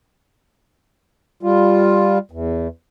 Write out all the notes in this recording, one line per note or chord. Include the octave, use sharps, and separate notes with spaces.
G3 F4
E2